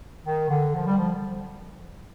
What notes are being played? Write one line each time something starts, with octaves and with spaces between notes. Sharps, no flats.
D#3
D3
F3
G3
F3